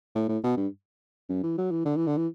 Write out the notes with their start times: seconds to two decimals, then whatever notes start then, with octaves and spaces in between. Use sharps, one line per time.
0.15 A2
0.28 A2
0.43 B2
0.57 G2
1.29 F#2
1.43 E3
1.58 F#3
1.71 E3
1.85 D3
1.96 E3
2.07 D3
2.17 E3